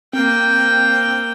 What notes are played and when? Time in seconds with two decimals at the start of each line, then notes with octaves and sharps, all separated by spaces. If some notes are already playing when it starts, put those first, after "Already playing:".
0.13 A#3 C4 G5